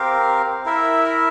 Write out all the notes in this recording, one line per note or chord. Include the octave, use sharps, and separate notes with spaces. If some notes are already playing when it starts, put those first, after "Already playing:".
Already playing: C4 G4 A#4 F5
E4 A#4 E5